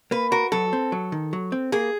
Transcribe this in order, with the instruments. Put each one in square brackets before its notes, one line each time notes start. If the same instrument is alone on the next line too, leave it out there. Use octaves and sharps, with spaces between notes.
[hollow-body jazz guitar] A#3 [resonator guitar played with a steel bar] B4
[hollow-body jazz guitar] F#4 [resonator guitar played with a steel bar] A#4
[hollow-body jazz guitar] F#3 [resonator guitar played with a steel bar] A4
[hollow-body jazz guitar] C4
F#3
D#3
F#3
C4
[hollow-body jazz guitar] A#3 [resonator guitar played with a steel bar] G#4